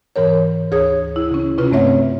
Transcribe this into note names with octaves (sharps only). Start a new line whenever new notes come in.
G#2 E3 A#4 C#5
D2 G#4 C#5 D#6 G#6
E4
C#3 C#4
C3 C#4 F4 B4
G2 A3 C4 C#5 E5 F#5